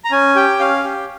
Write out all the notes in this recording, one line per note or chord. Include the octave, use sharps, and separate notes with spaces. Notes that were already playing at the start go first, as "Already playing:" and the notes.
A#5
C#4 G#5
G4 G5
C#4 F5
G4